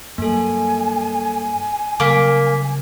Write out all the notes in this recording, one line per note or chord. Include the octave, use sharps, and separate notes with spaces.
G2 F#3 A#3 A4 G#5
C#3 F#3 G3 A#3 D6 B6